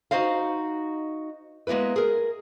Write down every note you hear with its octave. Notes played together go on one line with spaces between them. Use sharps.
D#4 F#4 C5 D#5 F5
G#3 A#3 B3 E4 B4
G#4 A#4